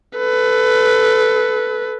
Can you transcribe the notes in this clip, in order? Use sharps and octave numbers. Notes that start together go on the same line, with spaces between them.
A4 B4